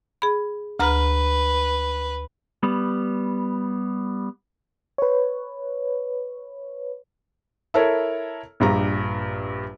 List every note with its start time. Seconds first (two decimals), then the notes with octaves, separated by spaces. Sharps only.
0.22 G#4 B5
0.79 D2 B4 A#5 F6
2.63 G3 B3
4.98 B4 C#5
7.74 E4 A4 A#4 C#5
8.60 A#1 G2 A#5